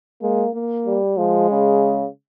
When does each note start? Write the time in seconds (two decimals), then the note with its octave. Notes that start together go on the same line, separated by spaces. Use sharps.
0.22 G#3 A#3
0.54 A#3
0.87 G3
1.18 F3 G#3
1.50 C#3